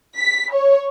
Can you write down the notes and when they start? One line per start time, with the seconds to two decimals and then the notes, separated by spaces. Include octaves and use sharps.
0.18 B6
0.53 C#5